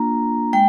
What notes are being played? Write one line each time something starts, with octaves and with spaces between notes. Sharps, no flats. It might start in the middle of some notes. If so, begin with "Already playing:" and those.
Already playing: A#3 D4 F4 A#5
G#3 G5